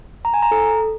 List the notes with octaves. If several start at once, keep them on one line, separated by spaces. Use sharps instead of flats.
A#5
G#5
A#5
A4